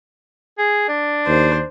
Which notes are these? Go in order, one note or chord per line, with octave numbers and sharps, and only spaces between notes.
G#4
D4
D#2 C5